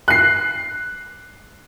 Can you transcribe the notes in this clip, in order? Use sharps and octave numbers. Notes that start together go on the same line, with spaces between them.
F#6 C7